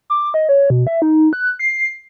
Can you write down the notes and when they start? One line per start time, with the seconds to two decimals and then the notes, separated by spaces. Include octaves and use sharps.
0.10 D6
0.34 D#5
0.49 C#5
0.70 B2
0.87 E5
1.02 D#4
1.33 F#6
1.59 C7